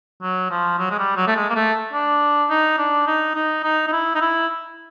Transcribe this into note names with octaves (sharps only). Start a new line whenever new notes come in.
F#3
F3
F#3
G#3
G3
F#3
A3
G#3
A#3
A3
D4
D#4
D4
D#4
D#4
D#4
D#4
E4
D#4
E4